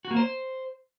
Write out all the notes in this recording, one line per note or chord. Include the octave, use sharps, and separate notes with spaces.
F#4
A#3
C5